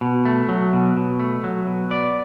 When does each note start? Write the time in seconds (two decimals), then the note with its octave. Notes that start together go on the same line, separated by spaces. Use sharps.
0.01 B2
0.25 A3
0.49 F#3
0.73 B2
0.97 B2
1.20 A3
1.44 F#3
1.67 B2
1.91 B3 D5